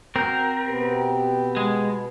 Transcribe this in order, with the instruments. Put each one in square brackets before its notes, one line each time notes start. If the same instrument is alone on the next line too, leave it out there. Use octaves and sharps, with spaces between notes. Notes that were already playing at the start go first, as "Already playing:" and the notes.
[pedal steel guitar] C4 G6 [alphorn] F#4 [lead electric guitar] A#4
[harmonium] B2 B3 [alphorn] G4
[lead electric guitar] G#3